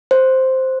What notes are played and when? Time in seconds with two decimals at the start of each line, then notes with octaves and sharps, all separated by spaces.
0.11 C5